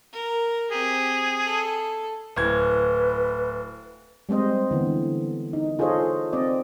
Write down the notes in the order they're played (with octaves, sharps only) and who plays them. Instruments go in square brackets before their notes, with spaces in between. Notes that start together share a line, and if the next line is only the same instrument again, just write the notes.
[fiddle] A#4
[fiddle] C4 G4 [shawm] G#4
[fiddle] A4
[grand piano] D1 G#6 [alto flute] B4
[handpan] G3 G#3 C4 C5 D#5
D3 E3 B3
D#4
F4 G#4 A4 C5 C#5 D#5
C4 D5 D#5